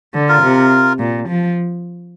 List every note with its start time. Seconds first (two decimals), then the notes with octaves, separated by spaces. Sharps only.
0.14 D3
0.29 F4 A#4
0.42 C3
0.99 A#2
1.29 F3